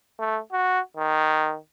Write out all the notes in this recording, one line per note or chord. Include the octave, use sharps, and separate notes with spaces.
A3
F#4
D#3